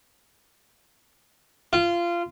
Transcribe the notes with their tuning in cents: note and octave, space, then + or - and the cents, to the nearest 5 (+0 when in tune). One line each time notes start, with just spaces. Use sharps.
F4 -20